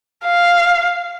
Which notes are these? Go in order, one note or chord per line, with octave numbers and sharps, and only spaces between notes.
F5